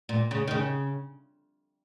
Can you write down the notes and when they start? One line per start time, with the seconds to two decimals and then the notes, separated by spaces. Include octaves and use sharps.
0.09 A#2
0.31 C#3
0.48 D#3
0.51 C#3